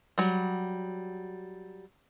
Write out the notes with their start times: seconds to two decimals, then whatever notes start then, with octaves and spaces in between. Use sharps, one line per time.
0.18 F#3 G3